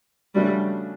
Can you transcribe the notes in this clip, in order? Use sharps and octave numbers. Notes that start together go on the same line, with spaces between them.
C#3 F3 G3 A3 D4 F#4